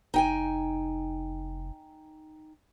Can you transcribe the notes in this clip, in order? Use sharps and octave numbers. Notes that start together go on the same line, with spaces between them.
F1 D#4 G5 G#5